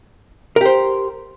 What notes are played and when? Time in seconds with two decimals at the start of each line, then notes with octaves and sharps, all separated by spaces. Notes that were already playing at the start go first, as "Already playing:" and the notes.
0.56 A#4
0.61 G4
0.66 C5